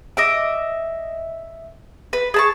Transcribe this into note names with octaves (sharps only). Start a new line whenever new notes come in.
D#5 E5 D6
B4
G#4 A5 C#6